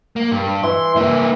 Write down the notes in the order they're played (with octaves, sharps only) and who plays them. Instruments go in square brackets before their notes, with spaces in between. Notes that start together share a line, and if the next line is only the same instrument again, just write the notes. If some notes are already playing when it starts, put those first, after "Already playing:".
[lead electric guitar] A#3
G2
[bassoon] E3 [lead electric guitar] C6
[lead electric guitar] G2 A#3 [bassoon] E3